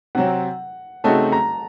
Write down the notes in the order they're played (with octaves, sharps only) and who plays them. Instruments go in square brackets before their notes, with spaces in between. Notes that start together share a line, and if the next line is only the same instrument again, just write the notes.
[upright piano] C3 F#3 C4 [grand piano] F#5
[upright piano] C#3 A3 C4 D#4 F#4 [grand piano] A5
[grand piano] A#5